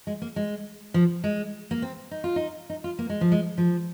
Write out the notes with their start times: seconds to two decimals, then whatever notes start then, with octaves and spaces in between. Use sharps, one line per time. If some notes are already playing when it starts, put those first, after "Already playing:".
0.07 G#3
0.22 A#3
0.36 G#3
0.94 F3
1.24 G#3
1.71 A#3
1.82 C4
2.11 D#4
2.24 F4
2.36 D#4
2.70 D#4
2.84 F4
2.99 A#3
3.10 G#3
3.21 F3
3.32 G#3
3.58 F3